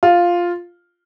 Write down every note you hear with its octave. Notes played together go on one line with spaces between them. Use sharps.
F4